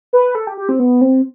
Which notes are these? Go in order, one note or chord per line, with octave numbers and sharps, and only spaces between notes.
B4
A4
G4
G4
C4
B3
C4